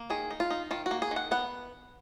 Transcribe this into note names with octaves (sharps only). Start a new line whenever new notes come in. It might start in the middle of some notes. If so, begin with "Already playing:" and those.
Already playing: A#3
D#3 G#4
D#4
F4
D#4
D#3 F4
F#4
A#3
G#4
D#3
F#5
B3 F#5